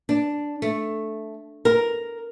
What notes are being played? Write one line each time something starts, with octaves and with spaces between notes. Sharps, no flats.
D4
A3
A#4